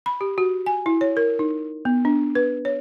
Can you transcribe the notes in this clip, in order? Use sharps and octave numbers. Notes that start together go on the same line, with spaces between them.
B5
G4
F#4
G#5
E4
C#5
A#4
D#4
B3
D4
B4
C#5